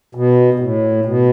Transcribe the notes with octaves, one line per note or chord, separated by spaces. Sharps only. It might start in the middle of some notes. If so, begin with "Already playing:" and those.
B2
B2
A2
B2